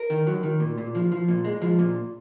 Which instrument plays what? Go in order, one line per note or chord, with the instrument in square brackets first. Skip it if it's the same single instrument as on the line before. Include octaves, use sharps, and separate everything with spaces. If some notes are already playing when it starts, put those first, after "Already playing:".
Already playing: [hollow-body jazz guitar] A#4
D#3
F#3
D#3
A#2
A#2
F3
F3
A#2
G#3
F3
A#2